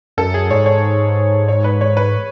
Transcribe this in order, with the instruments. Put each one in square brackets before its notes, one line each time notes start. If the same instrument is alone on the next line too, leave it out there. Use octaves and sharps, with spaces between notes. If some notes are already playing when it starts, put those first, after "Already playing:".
[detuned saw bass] F#2 [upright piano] A4
[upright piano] G#4
[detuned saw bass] G#2 [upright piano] C#5
[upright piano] C#5
C#5
B4
C#5
B4